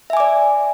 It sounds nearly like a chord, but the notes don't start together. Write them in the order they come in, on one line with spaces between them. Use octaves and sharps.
E5 G#5 D6 D5